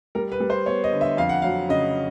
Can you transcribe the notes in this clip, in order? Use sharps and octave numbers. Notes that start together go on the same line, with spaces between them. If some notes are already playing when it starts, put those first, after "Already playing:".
G3 A#4
B4
G3
C5
B3 C#5
D#5
D3
E5
F2 F5
F#5
F#3 F5
C#3 D#5